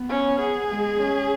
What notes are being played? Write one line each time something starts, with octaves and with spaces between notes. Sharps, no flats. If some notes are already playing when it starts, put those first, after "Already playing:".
Already playing: B3
C#4
G#4
G#3
C#4